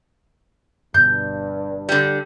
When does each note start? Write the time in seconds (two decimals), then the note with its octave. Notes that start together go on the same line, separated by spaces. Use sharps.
0.94 G1 G2 B2 G6
1.89 D3 G3